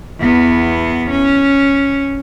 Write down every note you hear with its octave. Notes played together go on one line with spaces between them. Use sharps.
E2 B3
C#4